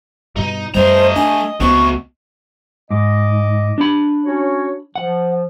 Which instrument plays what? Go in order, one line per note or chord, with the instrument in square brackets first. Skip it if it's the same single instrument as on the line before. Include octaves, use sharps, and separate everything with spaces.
[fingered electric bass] G2 B2 [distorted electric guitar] D#4
[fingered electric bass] F#2 G3 [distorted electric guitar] A3 A#5 [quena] C5 [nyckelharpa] D#5
[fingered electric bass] D4 [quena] G#5
[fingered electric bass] C#2 B3 C4 [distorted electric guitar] A3 F#4 [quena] C#6
[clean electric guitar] G#2 [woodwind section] D#5 D6
[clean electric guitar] D4 B5
[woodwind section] C#4 F#4 C#5
[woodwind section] F3 [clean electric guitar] F#5